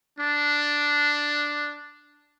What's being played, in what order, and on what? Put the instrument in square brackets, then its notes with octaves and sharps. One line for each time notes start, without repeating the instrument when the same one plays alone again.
[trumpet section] D4